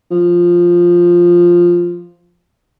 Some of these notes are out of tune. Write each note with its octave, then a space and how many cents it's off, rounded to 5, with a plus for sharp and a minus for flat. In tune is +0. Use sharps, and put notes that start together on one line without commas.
F3 +0